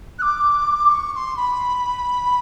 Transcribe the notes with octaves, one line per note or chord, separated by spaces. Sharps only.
F#6
D6
C#6
C#6
C6
B5